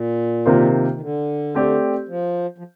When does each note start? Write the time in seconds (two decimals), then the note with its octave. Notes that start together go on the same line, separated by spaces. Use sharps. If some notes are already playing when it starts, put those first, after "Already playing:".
Already playing: A#2
0.46 C3 D#3 A#3 F4 C5
0.95 D#3
1.01 D3
1.55 A3 C4 G4 D5
2.09 F3
2.58 F3